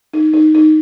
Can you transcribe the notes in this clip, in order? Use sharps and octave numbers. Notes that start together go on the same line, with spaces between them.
D#4
D#4
D#4